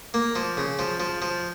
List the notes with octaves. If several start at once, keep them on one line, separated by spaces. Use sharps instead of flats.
A#3
F3
C#3
F3
F3
F3